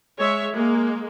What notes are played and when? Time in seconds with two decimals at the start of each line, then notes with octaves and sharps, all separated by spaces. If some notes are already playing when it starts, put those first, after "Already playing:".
0.18 G#3 C#5 E5
0.52 G#3 A#3